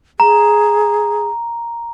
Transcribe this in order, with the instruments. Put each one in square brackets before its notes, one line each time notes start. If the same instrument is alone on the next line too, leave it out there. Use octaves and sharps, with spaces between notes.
[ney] G#4 [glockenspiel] A#5